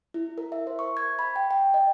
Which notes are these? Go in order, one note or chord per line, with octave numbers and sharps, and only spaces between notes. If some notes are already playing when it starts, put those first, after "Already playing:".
E4
A#4
E5
C5
C#6
G#6
B5
G5
G5
D#5